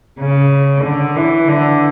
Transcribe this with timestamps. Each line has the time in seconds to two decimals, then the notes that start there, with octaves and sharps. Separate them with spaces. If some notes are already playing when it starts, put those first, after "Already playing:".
0.20 C#3
0.84 D3
1.16 E3
1.48 D3